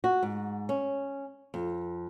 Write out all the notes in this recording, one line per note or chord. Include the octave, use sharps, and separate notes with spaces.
F#4
G#2
C#4
F2